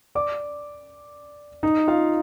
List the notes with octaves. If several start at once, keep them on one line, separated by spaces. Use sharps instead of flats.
D5 D6
D#4 D#5
F4 F5